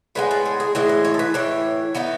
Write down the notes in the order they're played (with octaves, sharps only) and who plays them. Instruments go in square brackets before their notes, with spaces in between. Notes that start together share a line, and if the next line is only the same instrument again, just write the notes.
[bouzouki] A2 G#3 B3 B4
A4
G#4
G#4
A2 E3 G#3 B4
D#5
C#5
A4
B4
A2 E3 C#5
E3 B3 D#4